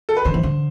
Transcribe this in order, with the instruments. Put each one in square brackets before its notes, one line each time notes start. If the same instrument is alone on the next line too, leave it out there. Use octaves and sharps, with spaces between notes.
[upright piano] A4
B4
[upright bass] D3 [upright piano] C5
[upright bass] E3
D3